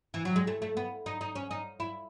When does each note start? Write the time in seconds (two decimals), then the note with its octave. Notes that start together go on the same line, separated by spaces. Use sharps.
0.14 E3
0.25 F#3
0.36 G#3
0.47 A3
0.62 A3
0.77 B3
1.06 D#4
1.21 D#4
1.35 C#4
1.51 D#4
1.80 E4